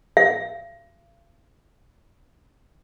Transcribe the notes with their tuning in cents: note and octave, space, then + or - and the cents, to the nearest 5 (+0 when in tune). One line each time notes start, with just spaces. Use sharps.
F5 -40